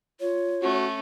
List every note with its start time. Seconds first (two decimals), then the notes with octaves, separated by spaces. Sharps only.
0.20 F4 C#5
0.61 A3 C#4 F#4